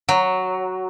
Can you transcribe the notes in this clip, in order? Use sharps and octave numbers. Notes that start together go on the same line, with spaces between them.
F#3